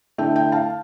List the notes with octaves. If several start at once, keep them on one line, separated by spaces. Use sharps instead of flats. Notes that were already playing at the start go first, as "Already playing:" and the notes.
D3 A3 E4 E5 G5
E5 G5
F5 A5